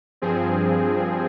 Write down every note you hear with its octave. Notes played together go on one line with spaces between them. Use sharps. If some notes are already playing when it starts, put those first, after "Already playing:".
G2 F3 C4 G#4